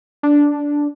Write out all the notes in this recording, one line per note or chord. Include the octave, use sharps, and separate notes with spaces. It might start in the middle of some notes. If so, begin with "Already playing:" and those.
D4